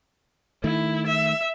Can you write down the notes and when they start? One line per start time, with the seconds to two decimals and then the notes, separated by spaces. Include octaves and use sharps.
0.64 D#3 A3 E4
1.07 E5